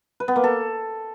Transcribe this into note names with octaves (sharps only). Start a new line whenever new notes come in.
B4
B3
A#3
A4